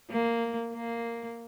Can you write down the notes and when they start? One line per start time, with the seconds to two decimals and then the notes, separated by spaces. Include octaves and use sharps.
0.10 A#3
0.74 A#3